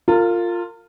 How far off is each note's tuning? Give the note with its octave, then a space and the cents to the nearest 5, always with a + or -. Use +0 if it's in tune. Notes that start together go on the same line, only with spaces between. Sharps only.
F4 +0 A#4 -35